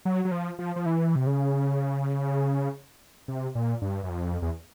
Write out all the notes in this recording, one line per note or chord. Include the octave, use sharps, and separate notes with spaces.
F#3
F#3
F3
F3
F3
E3
C3
C#3
C3
A#2
G2
F#2
F2
E2